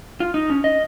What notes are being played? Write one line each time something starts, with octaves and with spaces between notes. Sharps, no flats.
F4
D#4
C#4
D#5